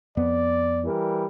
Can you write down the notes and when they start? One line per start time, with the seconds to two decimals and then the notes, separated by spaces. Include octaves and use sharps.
0.17 F2 B3 D5
0.84 E3 G3 A#4